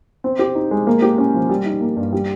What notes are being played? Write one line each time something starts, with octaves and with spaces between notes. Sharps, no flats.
C4
G4
D#4
G#3
A#3
G4
C#4
F3
G3
D#4
A#3
G2
G3